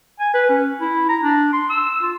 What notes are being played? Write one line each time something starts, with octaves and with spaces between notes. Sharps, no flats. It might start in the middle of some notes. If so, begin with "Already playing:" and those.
G#5
B4
C#4
E4
A#5
D4
C6
E6
F4